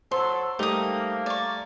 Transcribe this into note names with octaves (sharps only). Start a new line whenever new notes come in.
F#3 A4 C5 C6
G3 A3 A#3 D#4 G4 D#6
D5 C#6